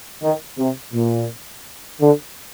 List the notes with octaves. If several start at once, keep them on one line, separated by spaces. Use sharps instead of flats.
D#3
C3
A#2
D3